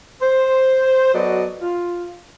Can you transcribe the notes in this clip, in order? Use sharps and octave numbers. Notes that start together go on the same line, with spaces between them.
C5
F#3 B3 F#4 A4 D5 D#5
F4